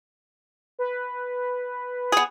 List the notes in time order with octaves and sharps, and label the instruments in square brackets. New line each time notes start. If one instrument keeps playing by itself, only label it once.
[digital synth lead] B4
[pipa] B3 G#4